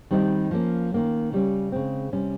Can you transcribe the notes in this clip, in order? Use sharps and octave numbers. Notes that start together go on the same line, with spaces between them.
D#3 G3 C4 D#4
F3 A#3 C#4
D#3 A#3 C#4
C#3 G3 C#4
C#3 G#3 C4
C3 G3 C#4